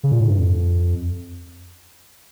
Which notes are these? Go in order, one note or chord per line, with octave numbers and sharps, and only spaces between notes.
C#3
A#2
A2
G2
F2